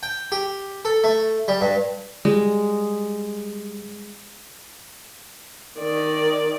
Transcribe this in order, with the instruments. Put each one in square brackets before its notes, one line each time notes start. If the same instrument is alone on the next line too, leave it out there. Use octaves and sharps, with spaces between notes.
[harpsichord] G5
G4
A4
A3
G3
G2
[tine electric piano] G3 [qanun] G#3
[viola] D#3 D5